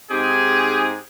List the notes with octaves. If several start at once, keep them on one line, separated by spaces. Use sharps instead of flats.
G#2 C4 D#4 G4 G#4